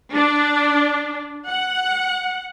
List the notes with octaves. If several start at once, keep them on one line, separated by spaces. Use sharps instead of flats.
D4
F#5